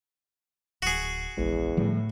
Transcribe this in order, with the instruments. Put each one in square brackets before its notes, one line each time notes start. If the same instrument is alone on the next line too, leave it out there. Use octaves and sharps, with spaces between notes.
[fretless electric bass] D1 [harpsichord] F#4 G#4
[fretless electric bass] F1 A#1 G#3 [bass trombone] E2
[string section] A2 [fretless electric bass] D3 F3 G3